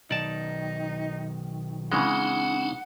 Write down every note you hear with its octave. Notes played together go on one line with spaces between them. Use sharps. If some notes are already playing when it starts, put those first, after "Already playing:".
B1 D#3 D#4 D5 A5
C#3 E3 G#3 C4 D4 D#4 F#5